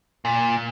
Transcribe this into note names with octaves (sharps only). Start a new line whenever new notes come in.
A#2